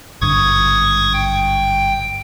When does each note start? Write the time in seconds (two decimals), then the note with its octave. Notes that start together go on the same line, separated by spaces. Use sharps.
0.21 G#1 G2 D3 C#6 D#6 G#6
1.13 G5